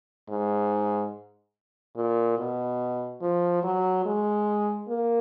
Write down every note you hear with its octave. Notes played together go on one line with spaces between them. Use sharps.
G#2
A#2
B2
F3
F#3
G#3
A#3